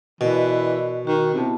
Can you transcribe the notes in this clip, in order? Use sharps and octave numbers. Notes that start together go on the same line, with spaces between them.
B2 E3 A#4 D5 D#5
D#3 F#4 C#6
C3 B3 E4 A5